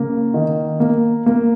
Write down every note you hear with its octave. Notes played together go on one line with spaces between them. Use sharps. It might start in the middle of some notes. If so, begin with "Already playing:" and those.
Already playing: C#3 A#3
D#3
A#3
A#3